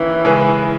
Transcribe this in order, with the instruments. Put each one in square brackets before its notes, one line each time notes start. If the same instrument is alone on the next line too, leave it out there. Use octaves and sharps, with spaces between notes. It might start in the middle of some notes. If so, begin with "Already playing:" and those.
Already playing: [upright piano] D#3 A#3 C#4 G4 [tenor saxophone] E3
[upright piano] C#3 G#3 C#4 G#4 B4